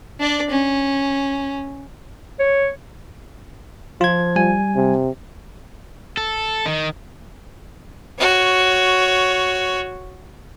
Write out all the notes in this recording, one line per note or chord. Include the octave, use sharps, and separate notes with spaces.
D4 D5
C#4
C#5
F3 F4 G#6
G3 G#5
C3
A4
D#3
F#4 C#5